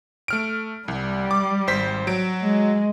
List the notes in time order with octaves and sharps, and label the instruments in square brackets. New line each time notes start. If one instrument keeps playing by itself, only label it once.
[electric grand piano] A3 F6 D7
[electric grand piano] C2 [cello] G3
[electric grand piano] D6
G#1 C5 B6
F#3 D7
[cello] G#3